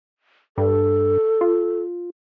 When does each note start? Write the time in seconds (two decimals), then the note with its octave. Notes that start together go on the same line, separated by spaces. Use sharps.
0.58 G2 A4
1.41 F4